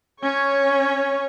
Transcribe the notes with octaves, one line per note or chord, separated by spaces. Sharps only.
C#4 C#5